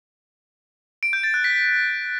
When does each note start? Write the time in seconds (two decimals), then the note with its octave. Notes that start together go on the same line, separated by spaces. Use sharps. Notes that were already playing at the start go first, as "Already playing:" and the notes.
1.03 D7
1.13 G6
1.23 A6
1.34 F#6
1.44 B6